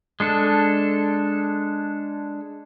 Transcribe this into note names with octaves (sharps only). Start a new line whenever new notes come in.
G#3 D4 A4